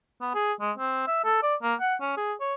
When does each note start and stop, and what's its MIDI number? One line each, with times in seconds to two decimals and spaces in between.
0.21 0.31 59
0.34 0.53 68
0.60 0.72 56
0.78 1.04 60
1.07 1.23 76
1.24 1.38 69
1.43 1.55 74
1.63 1.74 58
1.80 1.95 78
2.01 2.15 61
2.17 2.33 68
2.40 2.55 73